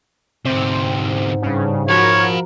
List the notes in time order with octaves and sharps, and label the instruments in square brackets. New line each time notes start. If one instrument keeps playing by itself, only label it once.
[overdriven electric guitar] D2 C3 [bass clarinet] G#2 [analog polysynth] C4
[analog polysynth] G2 C#3
[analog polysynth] F3 F#4 A#4 [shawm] C#5 [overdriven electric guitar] F5 B5